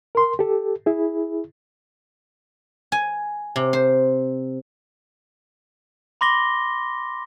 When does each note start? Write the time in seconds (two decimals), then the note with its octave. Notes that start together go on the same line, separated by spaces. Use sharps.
0.15 A#4 C6
0.39 G4 A4
0.86 E4 G#4
2.92 G#5
3.56 C3
3.73 C5
6.21 B5 C6 D6 A#6 G7